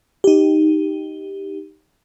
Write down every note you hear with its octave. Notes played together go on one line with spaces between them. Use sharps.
D#4 G4